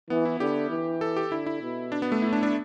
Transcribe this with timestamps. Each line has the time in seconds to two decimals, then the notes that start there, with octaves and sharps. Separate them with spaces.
0.10 E3 B3
0.25 E4
0.40 D3 G4
0.70 E3
1.01 A4
1.16 G4
1.31 D3 E4
1.46 E4
1.62 B2
1.92 D4
2.02 B3
2.12 A3
2.22 A2 E4
2.33 D4
2.43 D4